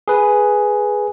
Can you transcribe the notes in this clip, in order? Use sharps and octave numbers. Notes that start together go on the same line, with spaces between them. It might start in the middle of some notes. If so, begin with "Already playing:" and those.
G#4 B4